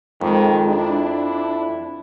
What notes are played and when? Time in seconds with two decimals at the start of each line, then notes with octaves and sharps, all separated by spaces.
0.21 F2 D#3 G#3
0.68 D4 E4